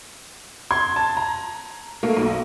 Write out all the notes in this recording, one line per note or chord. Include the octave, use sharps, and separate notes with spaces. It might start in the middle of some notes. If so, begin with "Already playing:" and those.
C6 G#6
A5
A#5
A3 A#3
B1